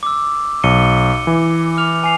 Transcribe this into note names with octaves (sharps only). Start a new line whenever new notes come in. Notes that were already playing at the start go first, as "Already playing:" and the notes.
D6 E6
B1 C#7 D#7 G7
E3
D6 F6 F7
G#5 C7 F7